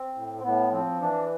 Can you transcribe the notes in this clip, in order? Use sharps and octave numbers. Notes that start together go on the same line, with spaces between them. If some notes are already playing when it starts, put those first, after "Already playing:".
Already playing: C4
A2
C4
A2 B3
F3 C4
E3 D4